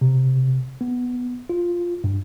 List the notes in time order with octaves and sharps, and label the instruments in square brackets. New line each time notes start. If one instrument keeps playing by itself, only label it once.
[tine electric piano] C3
B3
F4
G2